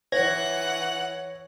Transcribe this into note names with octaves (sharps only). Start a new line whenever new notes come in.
E3 C#5 F#5 F#6 G#6 A#6